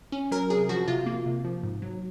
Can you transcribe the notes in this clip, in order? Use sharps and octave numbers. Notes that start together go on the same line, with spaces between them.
C#4
F#3 A#4
C3 G#4
F3 F#4
C3 F4
A#3
C3
F3
G#2
F#3